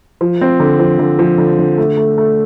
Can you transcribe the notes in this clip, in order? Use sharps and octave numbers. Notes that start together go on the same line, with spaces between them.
F3
C4
D3
F3
D3
F3
D3
D3
A3
A3
A3